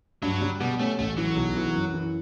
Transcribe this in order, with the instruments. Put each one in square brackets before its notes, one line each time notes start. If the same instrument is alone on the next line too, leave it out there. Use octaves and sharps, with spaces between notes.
[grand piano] G2 [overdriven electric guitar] F#3
[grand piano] G3
[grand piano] B2 [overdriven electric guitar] G3
[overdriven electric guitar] A3 [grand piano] C#4
[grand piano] A1 [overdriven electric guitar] A3
[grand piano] E3 [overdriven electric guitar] F#3
[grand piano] B1
E3
F#2
E3